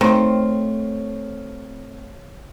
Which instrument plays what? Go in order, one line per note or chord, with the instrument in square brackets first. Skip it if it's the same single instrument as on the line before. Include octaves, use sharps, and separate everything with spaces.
[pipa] D#3 [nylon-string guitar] A3 A4 C5 [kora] C4 [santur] C#5 F5